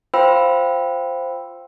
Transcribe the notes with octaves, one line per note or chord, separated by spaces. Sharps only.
F4 C5 F5 G5 B5 E6